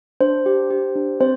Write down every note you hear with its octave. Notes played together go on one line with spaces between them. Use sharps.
D4 C5
G4
G4
D4
C4 C5